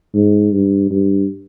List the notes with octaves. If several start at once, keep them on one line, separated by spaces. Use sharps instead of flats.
G#2
G2
G2